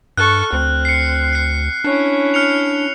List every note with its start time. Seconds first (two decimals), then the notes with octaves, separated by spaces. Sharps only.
0.17 G2 A4 C#6 F6 F#6
0.53 D2 C4
0.85 C7 C#7
1.33 F#6 C7
1.84 C#4 D4 E4
2.34 F6 C#7 F7